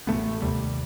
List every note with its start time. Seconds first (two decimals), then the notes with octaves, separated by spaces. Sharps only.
0.07 A1 D#3 A3 B3
0.42 D#2 C3 G3